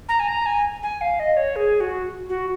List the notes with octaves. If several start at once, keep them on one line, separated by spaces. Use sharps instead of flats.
A#5
G#5
A#5
G#5
G#5
F5
D#5
C#5
G#4
F#4
F#4